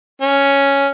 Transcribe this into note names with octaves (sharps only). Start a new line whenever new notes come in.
C#4